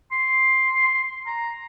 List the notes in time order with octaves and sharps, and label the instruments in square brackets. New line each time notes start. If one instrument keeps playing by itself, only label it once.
[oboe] C6
A#5